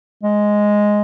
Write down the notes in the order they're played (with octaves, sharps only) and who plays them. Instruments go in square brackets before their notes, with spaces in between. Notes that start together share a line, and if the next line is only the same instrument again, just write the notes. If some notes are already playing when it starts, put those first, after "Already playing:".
[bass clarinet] G#3